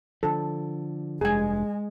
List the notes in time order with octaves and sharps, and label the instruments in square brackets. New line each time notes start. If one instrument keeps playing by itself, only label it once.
[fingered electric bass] D3 F3 [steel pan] A4
[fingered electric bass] F1 G2 [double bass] G#3 [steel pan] G#4 G#5